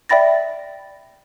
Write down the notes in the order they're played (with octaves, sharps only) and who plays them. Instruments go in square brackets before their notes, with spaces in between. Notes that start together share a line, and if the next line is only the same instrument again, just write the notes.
[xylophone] D5 E5 G5 B5 A6 A#6